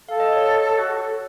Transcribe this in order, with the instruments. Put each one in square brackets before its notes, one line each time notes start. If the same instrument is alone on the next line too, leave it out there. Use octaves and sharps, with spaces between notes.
[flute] A4 [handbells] F5
[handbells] D#5
C#5
C#5
[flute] F#4
A4